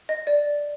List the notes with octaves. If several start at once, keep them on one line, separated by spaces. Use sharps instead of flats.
D#5
D5